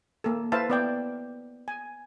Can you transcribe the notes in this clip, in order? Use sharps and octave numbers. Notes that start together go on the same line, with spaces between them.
A#3 A4
E4 B4 C5 E5 F5 A5
B3 D5 G5
G#5